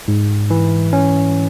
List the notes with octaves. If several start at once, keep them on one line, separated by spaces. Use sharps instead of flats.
G#2
E3
C#4